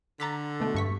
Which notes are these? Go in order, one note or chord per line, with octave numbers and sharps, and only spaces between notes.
D3 A#5 A6 B6
B2 A3
G2 C#6 B6